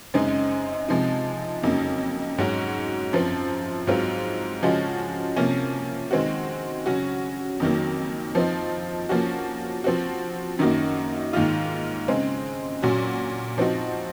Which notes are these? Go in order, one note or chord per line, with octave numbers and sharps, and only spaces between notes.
F#2 C#3 G#3 C4 D#4
C3 F3 G#3 D#4
F2 C#3 F#3 A#3 D#4
G#2 F#3 C#4 F#4
F#2 F3 C4
G#2 F#3 C4 F4
C#3 F3 G#3 C#4 F#4
C3 F3 A#3 C#4
D#3 G#3 C4 F#4
C#3 F#3 C#4 F#4
F2 D#3 F#3 A#3
F3 C4 D#4
F3 A#3 C#4 F#4
F3 C4 F#4
F#2 D#3 A#3 D#4 F#4
G#2 D#3 A#3 F4
C#3 G#3 C4
A#2 F#3 C#4 F#4
F3 C4 D#4 F#4